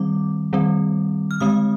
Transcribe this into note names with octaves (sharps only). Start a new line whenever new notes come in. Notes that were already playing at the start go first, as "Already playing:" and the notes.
Already playing: D#3 G3 C4 D6
D#3 G3 C4
F6
D3 G#3 C4 D#6